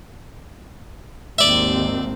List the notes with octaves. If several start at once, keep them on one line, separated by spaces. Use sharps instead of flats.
G#1 D#2 C4 D5 E5